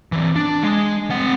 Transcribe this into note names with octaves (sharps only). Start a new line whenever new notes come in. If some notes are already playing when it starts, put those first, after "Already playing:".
E3 C4
D4
G#3
C4 F#5